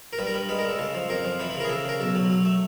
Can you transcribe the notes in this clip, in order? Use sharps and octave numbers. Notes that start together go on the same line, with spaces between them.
A#4
G2 B4
A#4
G2 B4
G#3 B4
A#4
G#3 A4
C#3 A4
F3
F2 A#4
F3
E3 B4
B4
C#3
A#4
G#4
C#3 A4
C#3 A#4
B1 A4
F#3
F#3
A3